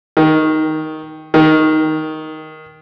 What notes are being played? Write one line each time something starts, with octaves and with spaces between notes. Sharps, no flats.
D#3
D#3